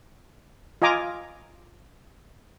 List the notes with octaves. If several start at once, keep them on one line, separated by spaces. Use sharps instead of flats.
F4 D#5 G#5 A#5 D6